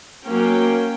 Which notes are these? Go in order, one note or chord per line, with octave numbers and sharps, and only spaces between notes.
F#3 A#3 C#4 G5